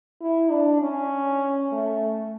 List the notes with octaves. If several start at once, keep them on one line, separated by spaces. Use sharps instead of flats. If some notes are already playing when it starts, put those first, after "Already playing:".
E4
D4
C#4
A3